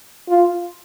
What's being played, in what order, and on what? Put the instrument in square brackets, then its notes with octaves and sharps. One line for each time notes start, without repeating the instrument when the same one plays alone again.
[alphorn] F4